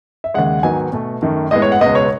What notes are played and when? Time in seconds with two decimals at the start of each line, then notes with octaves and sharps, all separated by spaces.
0.24 E5
0.34 D#2 C#3 G#3 F#5
0.63 G#2 D#3 F#3 B3 G#5
0.92 B2 A3
1.22 F#2 D#3 A3
1.51 A2 G#3 B3 D#5
1.62 C#5
1.72 F#5
1.81 C#2 B2 G#3 B3 D#5
1.95 C#5